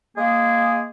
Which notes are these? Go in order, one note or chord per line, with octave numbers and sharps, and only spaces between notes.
G#3 A#3 G#4